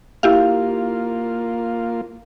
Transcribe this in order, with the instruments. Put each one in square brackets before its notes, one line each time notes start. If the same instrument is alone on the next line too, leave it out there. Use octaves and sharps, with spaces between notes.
[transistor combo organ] A#3 F4 [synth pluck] E4 G4 F5